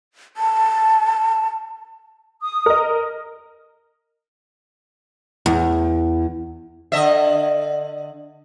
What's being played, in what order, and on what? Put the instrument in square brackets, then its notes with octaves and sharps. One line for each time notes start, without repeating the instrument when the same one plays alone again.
[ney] A5
[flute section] D#6
[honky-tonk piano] A#4 D#5
[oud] E2
[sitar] D3 D#5 E5